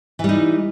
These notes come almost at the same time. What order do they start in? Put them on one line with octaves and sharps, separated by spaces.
E3 G3 D#4